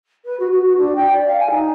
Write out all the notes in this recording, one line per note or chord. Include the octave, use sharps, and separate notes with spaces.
B4
F#4
F#4
F#4
D4
G5
D5
F5
G#5
D#4